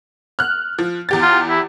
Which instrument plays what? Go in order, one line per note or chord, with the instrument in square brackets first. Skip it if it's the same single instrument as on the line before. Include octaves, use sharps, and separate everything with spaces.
[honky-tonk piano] F6 F#6
F3
E2 G4 A6
[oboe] F4
E4